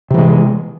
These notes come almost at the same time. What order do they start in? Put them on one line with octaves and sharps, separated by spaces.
C3 E3 G#3